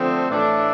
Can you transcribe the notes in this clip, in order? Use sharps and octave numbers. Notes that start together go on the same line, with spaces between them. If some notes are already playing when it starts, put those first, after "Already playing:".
Already playing: D3 F3 A3 C4
A2 E3 A3 D4